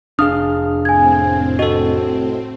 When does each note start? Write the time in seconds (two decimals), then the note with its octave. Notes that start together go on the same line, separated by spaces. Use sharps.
0.19 F1 D4 G#4 F5 D#6 F6
0.85 A2 C4 G#5 G#6
1.59 F#4 A4 D#5